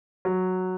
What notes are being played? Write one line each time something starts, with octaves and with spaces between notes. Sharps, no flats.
F#3